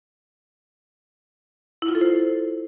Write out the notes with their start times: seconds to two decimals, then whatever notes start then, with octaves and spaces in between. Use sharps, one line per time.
1.82 E4
1.89 F4
1.95 A4
2.01 C5